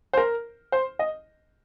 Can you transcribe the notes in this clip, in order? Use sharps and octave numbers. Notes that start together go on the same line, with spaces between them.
C5
A#4
C5
D#5